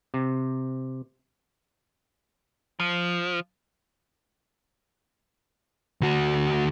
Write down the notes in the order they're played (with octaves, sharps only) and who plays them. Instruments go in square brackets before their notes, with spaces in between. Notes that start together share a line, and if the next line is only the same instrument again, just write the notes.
[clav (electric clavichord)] C3
[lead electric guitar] F3
D2 F#4